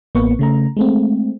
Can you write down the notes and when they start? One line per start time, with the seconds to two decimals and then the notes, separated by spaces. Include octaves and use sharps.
0.15 A1 A#3 B3 B4 C#6
0.39 C#3 A3 A#5
0.77 G#3 A3 C4